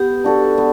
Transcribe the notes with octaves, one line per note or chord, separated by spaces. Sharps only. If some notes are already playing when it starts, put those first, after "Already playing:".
Already playing: B3 G4
D4 F#4 A4
B3